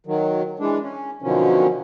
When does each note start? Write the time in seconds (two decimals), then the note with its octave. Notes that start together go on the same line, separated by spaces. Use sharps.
0.06 D#3 F#3
0.59 E3 G#3 D4
0.82 C#4
1.22 B2 D3 D#3 F3 F#3 C#4